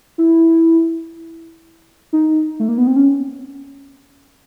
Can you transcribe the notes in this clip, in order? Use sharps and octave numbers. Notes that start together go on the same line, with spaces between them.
E4
D#4
A3
A#3
B3
C4
C#4